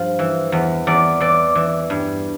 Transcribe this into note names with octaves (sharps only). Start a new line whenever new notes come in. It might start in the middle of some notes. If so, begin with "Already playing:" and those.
Already playing: G2 F3
E3
E2
E2 D5
E3 D5
E3
G2